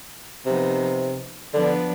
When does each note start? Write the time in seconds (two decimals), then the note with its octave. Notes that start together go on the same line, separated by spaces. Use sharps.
0.45 C3 F3 B3 D#4
1.54 D3 F3 B3 D4